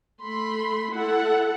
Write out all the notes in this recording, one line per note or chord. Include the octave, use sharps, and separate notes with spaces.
A3 B5 C6
E4 A4 F#5